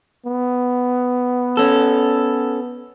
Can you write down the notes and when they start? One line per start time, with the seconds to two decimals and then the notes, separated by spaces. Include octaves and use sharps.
0.25 B3
1.57 C#4 A4